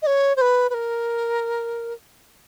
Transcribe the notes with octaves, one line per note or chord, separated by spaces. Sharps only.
D#5
C#5
C5
B4
B4
A#4